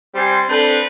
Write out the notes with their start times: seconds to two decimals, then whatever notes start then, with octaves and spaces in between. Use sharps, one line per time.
0.15 G3 C4 G#5 C6
0.49 C4 D4 A4 B4